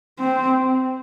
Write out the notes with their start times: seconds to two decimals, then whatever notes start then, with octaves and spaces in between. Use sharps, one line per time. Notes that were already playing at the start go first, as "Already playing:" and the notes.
0.19 C4